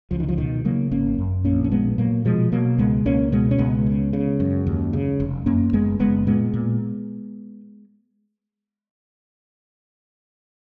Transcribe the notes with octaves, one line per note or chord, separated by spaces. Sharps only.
C#2 F3
D#3
F3
B2 D#3
C#3 F#3 A#3
G#1 A#3 C#4
F#2
A#1 A#3 C#4
C#4
A#2 G#3 B3
A#2 F#3 A#3
B2 F3 G#3
B2 F#3 A#3
C#2 G#3 B3
C#2 A#3 C#4
B2 G#3 B3
C#4
C#2 G#3 B3
C#3
C#3
F#2
D#2
C#3
F1
F#2 A#3 C#4
F#1 G#3 B3
F#1 G#3 B3
A#2 G#3 B3
A#2